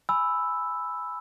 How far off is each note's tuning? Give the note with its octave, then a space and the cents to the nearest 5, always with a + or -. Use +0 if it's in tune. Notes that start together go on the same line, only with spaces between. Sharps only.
G#5 +0 B5 +5 E6 +0